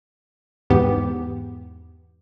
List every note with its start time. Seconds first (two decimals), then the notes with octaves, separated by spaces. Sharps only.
0.70 E2 G#2 B3 G4